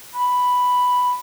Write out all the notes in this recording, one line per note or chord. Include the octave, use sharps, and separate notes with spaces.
B5